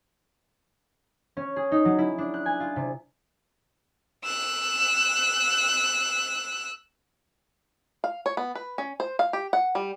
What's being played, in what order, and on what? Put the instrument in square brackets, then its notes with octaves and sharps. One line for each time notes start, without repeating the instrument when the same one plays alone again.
[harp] C#4
G#4
D#4
F#3
E4
D4
F#6
G#5
F4
C3
[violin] E6 F#6
[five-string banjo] F5
C#5
B3
B4
C#4
C5
F5
G4
F#5
G3